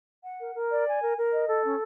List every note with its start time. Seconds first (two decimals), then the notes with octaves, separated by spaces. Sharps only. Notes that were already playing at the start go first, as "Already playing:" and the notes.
0.24 F#5
0.40 A#4
0.55 A#4
0.71 D5
0.86 G#5
1.02 A#4
1.17 A#4
1.32 D#5
1.48 A4
1.64 C#4